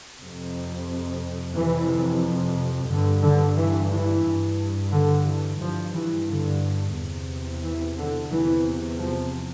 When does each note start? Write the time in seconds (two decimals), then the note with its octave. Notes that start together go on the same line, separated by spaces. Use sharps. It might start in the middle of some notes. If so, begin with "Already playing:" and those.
0.18 F2 C3
1.53 F2 C3 E3
2.89 G2 D3
3.23 D3
3.56 E3
3.90 E3
4.24 G2
4.92 D3
5.25 E3
5.60 G2 F3
5.94 E3
6.27 D3
6.95 E2 C3
7.63 E3
7.97 D3
8.30 E2 C3 E3
8.98 F3